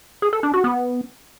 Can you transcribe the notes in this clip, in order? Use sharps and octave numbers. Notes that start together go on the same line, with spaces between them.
G#4
A4
D4
F#4
B3